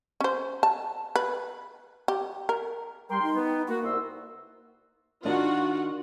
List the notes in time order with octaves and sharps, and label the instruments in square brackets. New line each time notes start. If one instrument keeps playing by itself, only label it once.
[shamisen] C#4 C5
A5
B4
G4
A#4
[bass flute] G3 [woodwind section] A#4 G5 C6
[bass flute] D#4
[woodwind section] B3
[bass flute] A#3 [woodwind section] F#4
[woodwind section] C2 C6 E6
[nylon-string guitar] D#3 D4 D#4 [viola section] F4 F#4 F#5